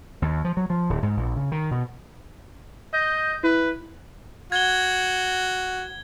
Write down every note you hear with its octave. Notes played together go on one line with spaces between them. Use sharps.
D#2
F3
F#3
F3
D1
G#2
A#1
C#3
D#3
B2
D#5 G6
E4 B4
F#4 G#6 G7